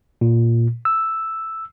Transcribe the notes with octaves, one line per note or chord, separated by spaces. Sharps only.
A#2
E6